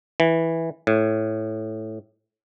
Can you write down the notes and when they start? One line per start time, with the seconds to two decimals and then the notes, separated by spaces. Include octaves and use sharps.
0.20 E3
0.87 A2